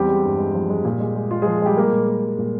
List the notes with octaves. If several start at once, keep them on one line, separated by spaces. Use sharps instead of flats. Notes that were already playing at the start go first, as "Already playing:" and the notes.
Already playing: E2 G3 C4 G4
G#3
G2
G#3
F3
G#3
A#2
G#3
G#3
G#3 F4
F3 G#3 G#4
G3 G#3 G4
G3 A#3 A#4
A#2
A#3
G3
A#2